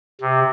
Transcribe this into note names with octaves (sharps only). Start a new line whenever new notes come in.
C3